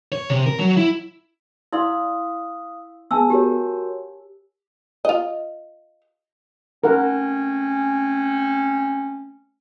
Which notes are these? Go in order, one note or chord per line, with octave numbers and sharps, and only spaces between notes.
C#5
C3
A#4
F#3
E4
E4 D5 F5 C6 D#6 E6
B3 G#4 G#5 A5 E6
F#4 G4 A#4 C#5
F4 D#5
A3 C4 C#4 A#4 F#5